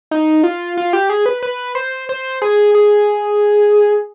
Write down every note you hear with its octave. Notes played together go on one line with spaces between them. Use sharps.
D#4
F4
F4
G4
G#4
B4
B4
C5
C5
G#4
G#4